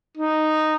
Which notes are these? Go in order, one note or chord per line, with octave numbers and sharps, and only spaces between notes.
D#4